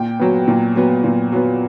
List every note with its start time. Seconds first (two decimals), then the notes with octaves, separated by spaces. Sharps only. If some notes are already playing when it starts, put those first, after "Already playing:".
Already playing: A#2 G5
0.20 F#3 B3
0.48 A#2
0.76 F#3 B3
1.04 A#2
1.33 F#3 B3